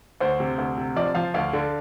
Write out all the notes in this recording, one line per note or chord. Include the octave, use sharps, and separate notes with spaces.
D2 C5
C3
D2
C3
F3 D5
F3 F5
D2 F5
D3